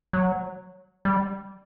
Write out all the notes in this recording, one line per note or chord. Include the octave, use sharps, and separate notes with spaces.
F#3
G3